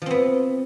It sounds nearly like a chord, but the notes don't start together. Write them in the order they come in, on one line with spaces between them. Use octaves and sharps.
F3 C4 B3